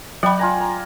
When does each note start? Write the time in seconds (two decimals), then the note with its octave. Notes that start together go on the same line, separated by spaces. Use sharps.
0.23 F#3 D5 F#5 G5 B5
0.39 F4 G#5 A#5
0.60 A#5